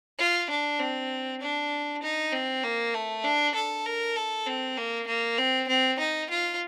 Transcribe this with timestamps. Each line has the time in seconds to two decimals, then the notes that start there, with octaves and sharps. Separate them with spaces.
0.18 F4
0.50 D4
0.80 C4
1.41 D4
2.03 D#4
2.32 C4
2.63 A#3
2.94 A3
3.24 D4
3.55 A4
3.85 A#4
4.16 A4
4.47 C4
4.77 A#3
5.07 A#3
5.38 C4
5.68 C4
5.99 D#4
6.30 F4